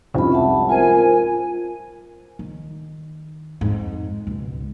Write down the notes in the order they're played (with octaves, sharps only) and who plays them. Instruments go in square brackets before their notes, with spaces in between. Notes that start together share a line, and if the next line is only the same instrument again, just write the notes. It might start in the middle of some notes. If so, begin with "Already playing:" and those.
[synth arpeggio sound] C2 F2 G#2 [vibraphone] C#4 F4 B5
[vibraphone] E5 F#5 A5
[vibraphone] F4 A#4 C5 [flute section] G#5
[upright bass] D#3
F2 G#2
C#2 B2